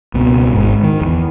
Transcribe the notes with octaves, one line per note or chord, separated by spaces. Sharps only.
C#2 B2
G#1 G#2
D#3
E2